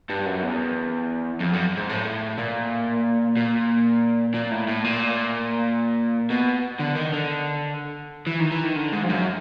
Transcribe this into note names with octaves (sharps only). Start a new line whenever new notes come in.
G2
F#2
E2
F2
F#2
G#2
A2
A#2
A#2
A#2
A2
A2
A#2
B2
D3
D#3
D3
E3
D#3
E3
D#3
D3
G#2
F2
F#2